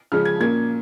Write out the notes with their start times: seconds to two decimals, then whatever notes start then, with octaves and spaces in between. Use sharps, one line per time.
0.12 C#3 F3 G#3 C#4 F6
0.25 G#6
0.40 A#2 A#3 C#4 G#6